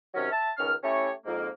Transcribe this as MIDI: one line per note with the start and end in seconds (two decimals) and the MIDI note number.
0.14 0.30 48
0.14 0.30 51
0.14 0.30 54
0.14 0.30 61
0.31 0.50 76
0.31 0.50 81
0.58 0.73 37
0.58 0.73 51
0.58 0.73 61
0.58 0.73 89
0.83 1.10 57
0.83 1.10 61
0.83 1.10 64
0.83 1.10 67
0.83 1.10 73
1.25 1.48 41
1.25 1.48 44
1.25 1.48 58